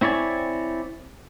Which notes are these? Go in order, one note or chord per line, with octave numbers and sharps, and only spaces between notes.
C4 E4 C#5 D5 G#5